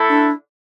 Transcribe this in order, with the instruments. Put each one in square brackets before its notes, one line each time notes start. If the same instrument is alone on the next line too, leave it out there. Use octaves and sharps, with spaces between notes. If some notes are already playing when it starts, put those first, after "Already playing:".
Already playing: [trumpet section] A3 E4 A4
[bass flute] D4